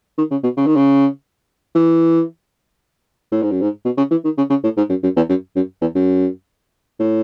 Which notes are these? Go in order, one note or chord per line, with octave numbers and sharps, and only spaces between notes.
D#3
C#3
B2
C#3
D#3
C#3
E3
A2
G#2
F#2
G#2
B2
C#3
E3
D#3
C#3
C#3
A2
G#2
F#2
F#2
E2
F#2
F#2
E2
F#2
A2